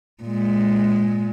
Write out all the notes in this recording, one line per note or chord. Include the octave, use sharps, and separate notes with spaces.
A#2 G#3